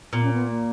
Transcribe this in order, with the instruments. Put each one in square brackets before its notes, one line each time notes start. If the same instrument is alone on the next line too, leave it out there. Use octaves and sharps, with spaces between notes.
[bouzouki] A#2 [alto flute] B3
[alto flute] C#4
B3
A#3